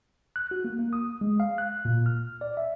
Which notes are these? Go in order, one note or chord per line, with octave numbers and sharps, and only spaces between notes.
F#6
F#4
A#3
A#3
D#6
G#3
F5
F#6
A#2
F6
D5
E5